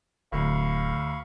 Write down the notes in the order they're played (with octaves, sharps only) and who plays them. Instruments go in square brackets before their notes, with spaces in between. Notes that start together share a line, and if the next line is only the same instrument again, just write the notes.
[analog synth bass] D1 [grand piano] D2 [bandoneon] F5 B5 C#6